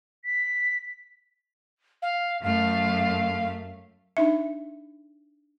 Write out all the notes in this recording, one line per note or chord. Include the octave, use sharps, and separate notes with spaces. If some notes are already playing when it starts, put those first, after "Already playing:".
B6
F5
F#2 A3 F5
D4 D#4 E5